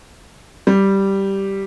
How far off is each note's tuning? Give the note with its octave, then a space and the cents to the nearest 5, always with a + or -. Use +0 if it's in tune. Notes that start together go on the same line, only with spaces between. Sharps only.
G3 -5